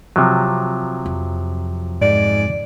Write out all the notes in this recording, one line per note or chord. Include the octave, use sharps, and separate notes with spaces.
C3 F3 F#3
F2
G#2 D5